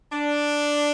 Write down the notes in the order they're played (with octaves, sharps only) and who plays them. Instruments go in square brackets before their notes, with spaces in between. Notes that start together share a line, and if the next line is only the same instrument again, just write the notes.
[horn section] D4